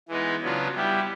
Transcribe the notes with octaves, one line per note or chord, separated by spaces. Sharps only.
E3 G#3 B3 D#4
C#3 F#3 B3 D4 F4
G3 B3 E4 G4